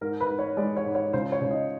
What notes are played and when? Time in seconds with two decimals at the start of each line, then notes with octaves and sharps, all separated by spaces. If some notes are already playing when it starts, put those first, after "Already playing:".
0.01 G#2 A#4
0.20 B4
0.29 G#2
0.39 C#5
0.57 G#3 D5
0.77 C#5
0.85 G#2
0.95 C#5
1.13 C#2 C5
1.32 C#5
1.41 C#2
1.51 D#5